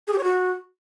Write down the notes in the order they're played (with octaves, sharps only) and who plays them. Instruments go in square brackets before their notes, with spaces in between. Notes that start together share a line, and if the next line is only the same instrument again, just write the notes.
[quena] G#4
G4
C#5
F#4